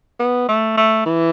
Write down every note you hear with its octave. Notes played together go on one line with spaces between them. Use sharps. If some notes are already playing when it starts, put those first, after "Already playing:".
B3
A3
A3
E3